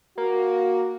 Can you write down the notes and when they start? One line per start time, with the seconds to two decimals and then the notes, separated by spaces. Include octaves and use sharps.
0.18 A#3 F#4